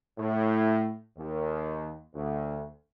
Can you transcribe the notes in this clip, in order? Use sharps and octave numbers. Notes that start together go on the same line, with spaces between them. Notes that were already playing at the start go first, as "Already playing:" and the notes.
A2
D#2
D2